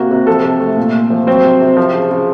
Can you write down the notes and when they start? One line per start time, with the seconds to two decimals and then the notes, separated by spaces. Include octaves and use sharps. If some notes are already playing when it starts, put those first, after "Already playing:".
Already playing: C3 A#3 F#4
0.11 C3
0.27 F3 A4
0.44 C3
0.60 A3
0.77 A#2
0.94 A#2
1.10 F3
1.27 F#3 C4 C5
1.45 C3
1.61 C3
1.77 F3
1.94 C#3
2.11 C#3